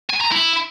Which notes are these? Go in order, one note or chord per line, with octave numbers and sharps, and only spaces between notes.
G#5
A#5
E4